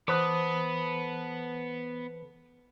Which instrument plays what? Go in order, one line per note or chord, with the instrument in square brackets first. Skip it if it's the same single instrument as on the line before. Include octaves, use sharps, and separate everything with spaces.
[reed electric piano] E3 C5 [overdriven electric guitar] B3 [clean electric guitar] A4 B4 [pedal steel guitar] D6 D#6